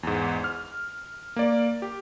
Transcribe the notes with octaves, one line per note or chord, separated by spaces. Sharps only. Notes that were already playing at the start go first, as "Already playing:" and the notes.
E2 G#2
F6
A#3 D5
G4